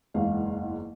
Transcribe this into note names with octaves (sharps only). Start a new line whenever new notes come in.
F#1 E2 G#2 F5